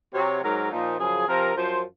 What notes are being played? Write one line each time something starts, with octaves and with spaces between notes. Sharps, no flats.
C3 F#3 C#5
G#2 F#3 A#4
A#2 F3 D#4
F#2 C#3 F3 G#4
C3 F3 A#4
F#2 F3 C5